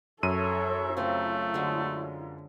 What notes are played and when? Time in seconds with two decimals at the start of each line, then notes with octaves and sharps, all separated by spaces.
0.23 F#2 A4 C#5 E5 D#7
0.97 C#3 A3 C4 F4
1.54 D3 F#3 G#3